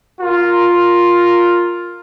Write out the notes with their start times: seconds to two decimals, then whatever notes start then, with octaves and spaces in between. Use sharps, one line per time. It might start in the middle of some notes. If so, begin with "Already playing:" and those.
0.21 F4 A#4